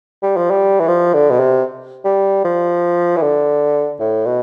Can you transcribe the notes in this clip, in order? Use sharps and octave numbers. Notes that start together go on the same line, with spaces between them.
G3
F3
G3
E3
F3
D3
B2
C3
G3
F3
E3
D3
A2
B2